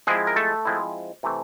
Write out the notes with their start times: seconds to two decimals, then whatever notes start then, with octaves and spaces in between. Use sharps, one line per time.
0.07 F3 G#3 C4 E4 G#4
0.27 A#4
0.36 A3 A4
0.65 F3 G#3 C4 E4
1.23 C3 E3 A3 C4